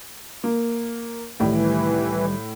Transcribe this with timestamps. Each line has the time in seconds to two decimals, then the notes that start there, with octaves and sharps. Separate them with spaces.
0.44 A#3
1.40 C2 A2 D#3 E3 G3